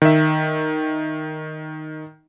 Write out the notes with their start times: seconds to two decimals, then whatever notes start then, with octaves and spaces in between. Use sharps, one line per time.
0.02 D#3 E5